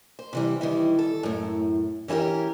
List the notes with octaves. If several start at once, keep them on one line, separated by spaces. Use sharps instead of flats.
C5
C3 E3 G3
D#3 E3 G3
A4
F#2 A2
E3 C#4 E4 G4 A#4